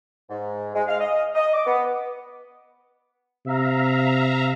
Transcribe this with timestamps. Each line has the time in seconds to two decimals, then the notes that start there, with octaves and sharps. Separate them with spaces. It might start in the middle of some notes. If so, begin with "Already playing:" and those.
0.30 G#2
0.75 G#3
0.88 F5
0.99 D#5
1.34 D#5
1.54 D6
1.66 B3
3.46 C3 E5 F5 A#5